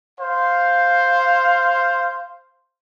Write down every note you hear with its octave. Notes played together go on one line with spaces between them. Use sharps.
C5 F5